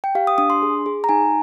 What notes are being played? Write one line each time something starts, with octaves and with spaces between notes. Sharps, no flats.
G5
G4 F5
D#6
D4 D#6
C6
G#4
G#4
A#5
D#4 G#5